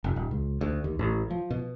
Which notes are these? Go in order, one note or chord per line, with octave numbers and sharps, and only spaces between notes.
F1
D#1
C#2
D2
D#2
A1
F3
B2